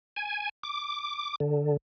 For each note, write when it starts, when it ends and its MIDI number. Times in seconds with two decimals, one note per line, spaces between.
0.16 0.49 80
0.63 1.35 86
1.40 1.77 50